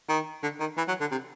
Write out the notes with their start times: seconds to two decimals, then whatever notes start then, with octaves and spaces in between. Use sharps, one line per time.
0.09 D#3
0.43 D3
0.60 D#3
0.77 E3
0.88 F#3
1.00 D3
1.11 C3